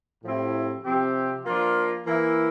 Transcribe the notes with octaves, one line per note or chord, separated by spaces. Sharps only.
A2 F3 C4 E4 G4
C3 F3 C4 G4
F3 A#3 D4 F4
E3 A#3 E4